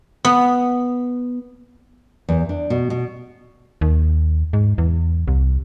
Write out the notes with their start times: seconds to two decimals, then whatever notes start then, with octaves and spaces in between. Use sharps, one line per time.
0.25 B3
2.29 E2
2.49 D4
2.70 B2
2.90 B2
3.81 D#2
4.53 G#2
4.78 E2
5.28 C2